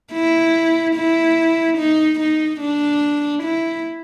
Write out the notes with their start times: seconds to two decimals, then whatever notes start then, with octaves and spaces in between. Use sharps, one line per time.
0.13 E4
0.96 E4
1.77 D#4
2.20 D#4
2.60 D4
3.43 E4